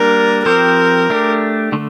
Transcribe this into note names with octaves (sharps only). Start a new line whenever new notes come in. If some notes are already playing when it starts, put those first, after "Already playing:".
Already playing: G3 A#3 D4 A#4
F3 C4 G4 A#4 C5
A3 D4 G4
D3 A3